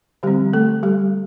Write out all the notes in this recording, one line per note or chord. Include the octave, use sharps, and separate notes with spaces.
D3 F3 G3 C4 G4
A3 A4
G3 G4